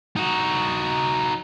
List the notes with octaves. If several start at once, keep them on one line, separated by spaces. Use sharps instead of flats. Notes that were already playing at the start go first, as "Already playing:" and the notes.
D#4 F#4